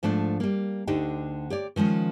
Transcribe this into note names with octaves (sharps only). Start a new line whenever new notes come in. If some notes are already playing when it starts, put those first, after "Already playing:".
G#2 F3 A3 D4 F4
G3 A#3
D2 D3 D4 D#4 G4
G4 C#5 D5
D#3 F3 G#3 C#4